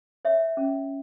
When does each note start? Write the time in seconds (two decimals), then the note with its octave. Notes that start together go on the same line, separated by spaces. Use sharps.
0.25 C#5 E5
0.57 C#4